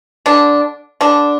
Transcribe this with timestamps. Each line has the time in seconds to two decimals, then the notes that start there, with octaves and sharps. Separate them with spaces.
0.26 D3 D4
1.01 D3 D4